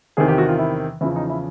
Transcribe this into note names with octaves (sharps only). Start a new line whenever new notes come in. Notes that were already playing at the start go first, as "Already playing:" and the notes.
E2 C3 D#3 G#4
G4
F#4
F4
E4
E2 C#3 F3 E4
D#4
E4